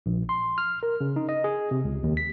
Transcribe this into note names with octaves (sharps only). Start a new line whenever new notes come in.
A#1
C6
F6
A#4
C#3
D#4
D#5
G#4
C3
C#2
D#2
B6